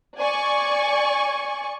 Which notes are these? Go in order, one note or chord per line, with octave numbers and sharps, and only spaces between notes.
D5 G#5 C#6